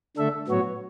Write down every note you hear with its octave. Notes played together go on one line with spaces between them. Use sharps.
D3 A3 D4 A4 E5
A2 F#3 B3 F#4 C#5